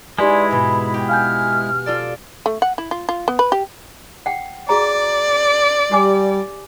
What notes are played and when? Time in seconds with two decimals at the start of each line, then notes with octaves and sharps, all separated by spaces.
0.18 G#3 D#4 E4 G4 B4 D5 G#5 C6
0.51 G#2 B2 B5
0.94 G4
1.09 F5 G#5 F6 G6
1.86 F4 A4 D5
2.46 A3
2.62 F#5
2.78 E4
2.91 F4
3.09 F4
3.28 B3
3.39 B4
3.52 G4
4.26 F#5 G5
4.69 F#4 G#4 D5 A#5
5.92 G3 G4 G#5 D6